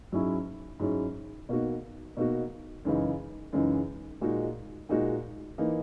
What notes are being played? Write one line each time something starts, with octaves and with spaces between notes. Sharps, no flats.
G#2 F#3 C#4 E4
G#2 F#3 C#4 E4
B2 A#3 D#4 F#4
B2 A#3 D#4 F#4
F#2 C#3 E3 G#3 D#4
F#2 C#3 E3 G#3 D#4
A#2 G#3 D#4 F#4
A#2 G#3 D#4 F#4
E3 A#3 D#4